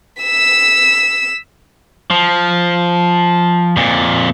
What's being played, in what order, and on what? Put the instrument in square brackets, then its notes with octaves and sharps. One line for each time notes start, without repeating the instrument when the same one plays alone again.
[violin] E6 B6
[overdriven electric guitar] F3
F2 A#2